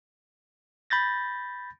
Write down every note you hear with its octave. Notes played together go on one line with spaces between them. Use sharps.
B5 G6 A6 A#6